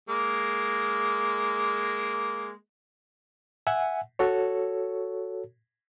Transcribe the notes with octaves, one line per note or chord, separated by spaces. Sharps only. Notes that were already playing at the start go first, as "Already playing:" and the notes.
G#3 A#3
E5 F#5 G#5
F#4 A4 C#5